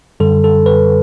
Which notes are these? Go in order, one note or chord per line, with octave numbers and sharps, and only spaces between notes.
F#2 D3 G3 A4
A4
B4